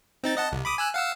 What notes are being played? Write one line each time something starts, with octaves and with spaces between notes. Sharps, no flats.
C4 D#4 A6
D#5 F#5 A5
C2
B5 D6 D#6
G#5 E6 F#6
F5 F#5 E6